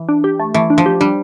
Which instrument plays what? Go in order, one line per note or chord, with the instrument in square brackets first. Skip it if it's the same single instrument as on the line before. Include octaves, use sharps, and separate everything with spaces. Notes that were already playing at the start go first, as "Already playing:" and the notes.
Already playing: [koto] E3
[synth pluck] D4
G4
A3
[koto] E3 [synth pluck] A3
[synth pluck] D4
[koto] F3
[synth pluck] G4
[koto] G3 [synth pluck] D4